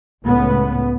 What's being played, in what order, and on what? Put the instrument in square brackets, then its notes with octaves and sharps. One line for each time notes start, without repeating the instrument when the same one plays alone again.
[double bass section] C#2 A2 B3